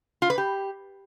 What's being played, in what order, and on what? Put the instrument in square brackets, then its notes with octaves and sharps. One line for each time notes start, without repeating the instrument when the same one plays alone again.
[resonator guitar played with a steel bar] F4
B4
G4